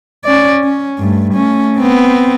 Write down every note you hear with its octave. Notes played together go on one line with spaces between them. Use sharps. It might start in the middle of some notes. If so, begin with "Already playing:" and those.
C#4 D5
C#4
G2 A3
A3 C#4
B3 C4